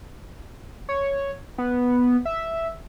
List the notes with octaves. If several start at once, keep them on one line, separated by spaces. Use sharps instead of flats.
C#5
B3
E5